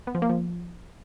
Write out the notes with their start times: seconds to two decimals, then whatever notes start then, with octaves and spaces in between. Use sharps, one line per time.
0.07 B3
0.15 F3
0.22 A#3
0.29 F3